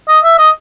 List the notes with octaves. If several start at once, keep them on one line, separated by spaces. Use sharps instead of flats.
D#5
E5
D#5